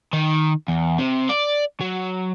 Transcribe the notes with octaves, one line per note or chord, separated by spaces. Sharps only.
D#3
E2
C3
D5
F#3